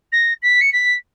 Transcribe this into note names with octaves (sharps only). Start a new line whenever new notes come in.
A#6
B6
C#7
B6